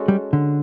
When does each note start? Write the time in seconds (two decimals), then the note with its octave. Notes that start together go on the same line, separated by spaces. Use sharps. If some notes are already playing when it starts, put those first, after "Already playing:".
Already playing: G#3 C#4 F#4 A4
0.08 G3
0.33 D3